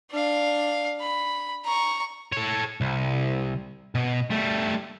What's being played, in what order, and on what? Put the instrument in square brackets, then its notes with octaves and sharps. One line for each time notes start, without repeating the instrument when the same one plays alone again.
[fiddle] D4 F5
B5
A#5 C#6
[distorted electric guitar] A4 C#5
C2
B2
G3 A3